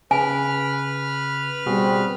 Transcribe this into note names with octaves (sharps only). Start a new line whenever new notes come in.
C#3 B4 G#5 F6
B2 G3 C4 F#4 G#4